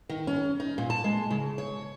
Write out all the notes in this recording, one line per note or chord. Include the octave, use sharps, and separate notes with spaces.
D#3
C#4
D#4
A#2
A5
G#3
C#3
C#5